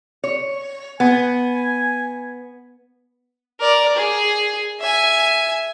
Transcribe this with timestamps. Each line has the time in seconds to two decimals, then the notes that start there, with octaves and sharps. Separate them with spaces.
0.24 C#5
1.00 B3 G#5
3.60 A#4 D5
3.96 G#4
4.80 E5 G#5